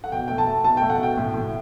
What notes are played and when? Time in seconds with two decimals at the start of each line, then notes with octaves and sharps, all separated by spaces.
0.04 F#5
0.12 B2 G5
0.28 A3 G5
0.38 A5
0.47 A3
0.64 B2 A5
0.77 A3 G5
0.90 F#5
0.99 B2 G5
1.17 A2
1.34 A2